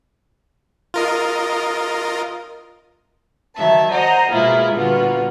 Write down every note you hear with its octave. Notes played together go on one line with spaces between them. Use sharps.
F4 A#4 D#5
D#3 F#3 E5 A5
C5 D#5 F#5 A#5
B2 G#3 A#3 E4 F4 G#4
A#2 D3 G3 B3 F4 F#4